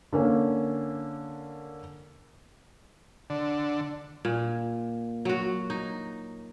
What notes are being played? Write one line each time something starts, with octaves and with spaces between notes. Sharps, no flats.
D3 A#3 C#4
D3
A#2
F#3 F#4
D#4